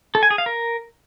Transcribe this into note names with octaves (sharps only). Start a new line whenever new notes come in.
A4
G#5
G#4
F5
A#4